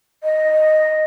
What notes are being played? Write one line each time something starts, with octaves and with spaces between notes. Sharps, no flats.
D#5